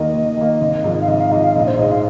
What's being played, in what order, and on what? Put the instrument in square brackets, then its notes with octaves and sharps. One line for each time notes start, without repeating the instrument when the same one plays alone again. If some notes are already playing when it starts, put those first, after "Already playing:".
Already playing: [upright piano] D#2 D#3 A#3 [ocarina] D#5
[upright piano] D#2
D#3 A#3
G#1
G#2 F3
[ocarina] F5
[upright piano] G#1 [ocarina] D#5
[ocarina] F5
[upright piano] G#2 F3 [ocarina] D#5
[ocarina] F5
[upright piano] A#1 [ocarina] D#5
[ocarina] C5
[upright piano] G#2 G#3 [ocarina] D#5
[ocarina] F5